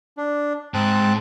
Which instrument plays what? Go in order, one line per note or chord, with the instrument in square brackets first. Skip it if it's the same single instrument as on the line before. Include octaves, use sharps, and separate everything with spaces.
[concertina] D4
[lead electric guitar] G#2 [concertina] C4 A5 F#6